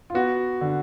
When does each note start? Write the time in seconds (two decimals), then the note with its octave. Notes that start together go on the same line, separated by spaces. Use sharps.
0.10 F4
0.14 B3 F#4
0.61 D3